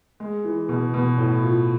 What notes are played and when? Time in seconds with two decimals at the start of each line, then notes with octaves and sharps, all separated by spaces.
0.20 G#3
0.44 E3
0.69 B2
0.94 B2
1.18 A2
1.43 F3